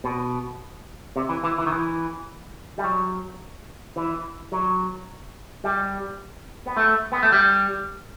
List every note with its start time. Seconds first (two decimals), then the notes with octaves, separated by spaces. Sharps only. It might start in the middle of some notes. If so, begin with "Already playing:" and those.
0.04 B2
1.16 C3
1.29 E3
1.44 E3
1.58 E3
1.66 D#3
1.72 E3
2.78 G3
2.84 F#3
3.96 E3
4.52 F#3
5.64 G3
6.66 B3
6.77 A3
7.12 B3
7.23 A3
7.32 G3